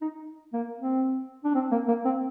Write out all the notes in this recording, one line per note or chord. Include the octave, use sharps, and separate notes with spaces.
D#4
A#3
C4
D4
C4
A#3
A#3
C4